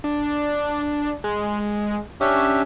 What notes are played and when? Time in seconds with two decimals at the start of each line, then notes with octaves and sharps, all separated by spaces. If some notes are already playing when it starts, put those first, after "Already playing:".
0.04 D4
1.24 G#3
2.21 C#4 D4 G4 E5